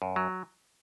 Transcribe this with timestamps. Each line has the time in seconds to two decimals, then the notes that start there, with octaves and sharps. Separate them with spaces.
0.02 F#2
0.16 F#3